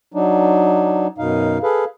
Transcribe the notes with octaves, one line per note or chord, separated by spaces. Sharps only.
F#3 D4 D#4
F#2 B2 D#4 F5
G#4 A4 B4 F5